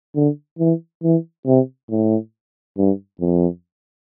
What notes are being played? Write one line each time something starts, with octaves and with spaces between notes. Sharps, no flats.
D3
E3
E3
C3
A2
G2
F2